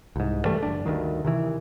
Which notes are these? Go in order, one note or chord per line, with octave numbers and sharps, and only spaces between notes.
C2 G#2
G2 E3 G3 A3
F#1 D4
D2 G2 D#3
C3 D#3 E3